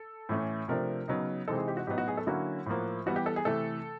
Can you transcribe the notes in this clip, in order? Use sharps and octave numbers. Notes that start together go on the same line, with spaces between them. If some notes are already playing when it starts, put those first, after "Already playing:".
Already playing: A4
A2 E3 A3 C#4
C3 F3 A3 D4 A#4
C#3 F#3 B3 D#4
C3 E3 G#3 C4 D#4 A4
G#4
G4
F#4
A2 F#3 B3 D#4 G4
F#4
G#4
A4
D3 F#3 A#3 C#4 E4 F#4
A2 F3 A#3
E3 G3 B3 F#4
G4
A4
G#4
C3 E3 A3 A4